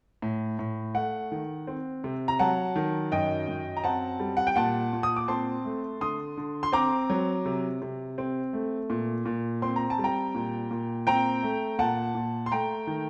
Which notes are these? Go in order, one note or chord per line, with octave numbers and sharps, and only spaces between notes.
A2
A2
A3 F#5
D#3
C4
C3
A#5
F#3 F#5 A5
D#3
F#2 D#5 G5
F#2
A#5
C4 F#5 A5
G3
F#5
G5
A#2 F#5 A5
A#2
D#6
D6
C4 A5 C6
A3
D3 C6 D#6
D3
C6
C4 A#5 D6
F#3
C3
C3
C4
A3
A#2
A#2
C4 C6
A#5
A5
G3
G5 A#5
A#2
A#2
C4 G5 A#5
A3
A#2 F#5 A5
A#2
C6
A3 G5 A#5
D#3